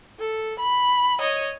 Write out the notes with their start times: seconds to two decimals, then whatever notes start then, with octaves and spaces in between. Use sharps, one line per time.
0.19 A4
0.59 B5
1.20 C#5 D#5